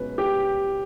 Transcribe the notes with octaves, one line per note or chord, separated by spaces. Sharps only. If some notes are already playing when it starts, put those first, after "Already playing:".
Already playing: C#2 B2 F#3 C#4 B4
G4